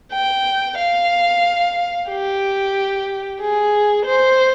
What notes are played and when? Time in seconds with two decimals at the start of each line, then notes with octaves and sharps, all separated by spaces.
0.13 G5
0.78 F5
2.09 G4
3.41 G#4
4.06 C5